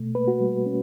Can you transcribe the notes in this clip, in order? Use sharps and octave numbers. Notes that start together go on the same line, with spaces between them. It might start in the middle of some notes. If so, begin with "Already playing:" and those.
Already playing: B2 A3
A#3 B4
F#4
G3
C#4